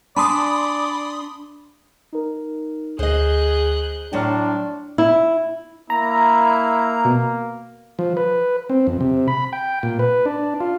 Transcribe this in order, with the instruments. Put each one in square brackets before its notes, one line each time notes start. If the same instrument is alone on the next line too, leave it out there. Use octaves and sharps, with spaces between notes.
[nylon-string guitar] D4 G#5 A5 [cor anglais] D5 [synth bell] B5 C6 D#6
[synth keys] D#4 A#4
[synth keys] D2 [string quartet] G#4 F#6 G6 [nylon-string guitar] C5 D#5
[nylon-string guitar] A2 F#3 [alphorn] D4 [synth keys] G5 C6 F6
[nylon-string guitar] E4
[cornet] A#3 [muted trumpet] E4 [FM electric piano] A#5
[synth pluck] B2
[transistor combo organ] F3
B4
C4
F2
C3
B5
G5
A#2
B4
D4
F4